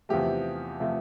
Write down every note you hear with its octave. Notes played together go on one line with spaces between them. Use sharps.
E2 C3 F3 A3 G4
C3 F3 A3